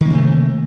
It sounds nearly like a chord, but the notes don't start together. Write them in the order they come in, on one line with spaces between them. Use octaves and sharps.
D#3 A#3 C3 A3